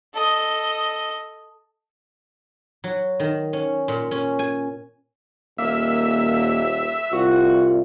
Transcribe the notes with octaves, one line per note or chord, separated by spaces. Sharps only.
A4 D#5
F#3
D#3
C#4
A#2
C#4
G#5
D#1 A#3 E5
C2 F4 F#4